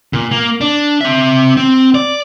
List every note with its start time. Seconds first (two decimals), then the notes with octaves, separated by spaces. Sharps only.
0.13 A#2
0.31 A#3
0.61 D4
1.01 C4 E5
1.57 C4
1.94 D5